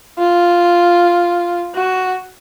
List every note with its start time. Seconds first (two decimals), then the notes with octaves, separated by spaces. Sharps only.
0.18 F4
1.75 F#4